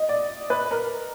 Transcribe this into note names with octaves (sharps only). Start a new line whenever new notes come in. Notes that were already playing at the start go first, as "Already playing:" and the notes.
Already playing: D#5
D5
B4
A#4